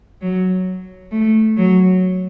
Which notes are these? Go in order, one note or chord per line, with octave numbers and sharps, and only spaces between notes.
F#3
A3
F#3